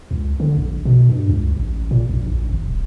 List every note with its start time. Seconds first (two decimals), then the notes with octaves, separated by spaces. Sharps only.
0.11 C#2
0.40 D3
0.57 A#1
0.85 B2
1.09 G2
1.29 C#2
1.57 A1
1.91 A#2
2.09 A#1
2.27 A#1
2.50 G#1
2.65 D#1